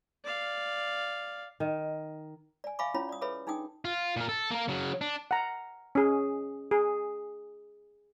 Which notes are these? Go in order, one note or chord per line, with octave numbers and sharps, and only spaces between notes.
D5 F5
D#3
D5 G#5
E5 F5 G#5 B5 C#6 D6
C#4 E4 F4 C#5 B5
D5 D#6
G#4 A4 B4 C#5 E5 B5
D4 D#4 G#4 G5 D#6
F4
A#2 A#4
A4
A#3 A#4
C#3 F#3
D4
F#5 A#5
C#4 G#4
G#4